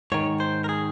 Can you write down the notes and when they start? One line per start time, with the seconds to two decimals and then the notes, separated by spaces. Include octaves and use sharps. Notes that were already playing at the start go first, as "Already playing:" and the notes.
0.12 G#2 D#3 C#5
0.40 C5
0.64 A#4
0.69 G#4